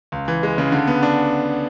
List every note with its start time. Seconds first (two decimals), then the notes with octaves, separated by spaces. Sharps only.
0.12 C#2
0.28 E3
0.43 G#3
0.58 C#3
0.72 D3
0.87 B3
1.03 D4